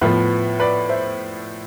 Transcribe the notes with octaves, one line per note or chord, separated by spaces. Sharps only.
A2 F3 B3 B4
B4 D5
C5 E5